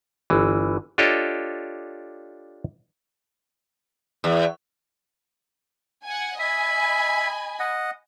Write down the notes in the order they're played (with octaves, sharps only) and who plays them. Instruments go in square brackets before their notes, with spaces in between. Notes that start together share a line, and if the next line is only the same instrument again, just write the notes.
[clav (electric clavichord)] G1 E3
D4 F4 G4 A4 C#5 D#5
[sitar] E2
[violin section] F#5 G#5
[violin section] D#5 G#5 B5 [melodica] E5
[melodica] D#5 F#5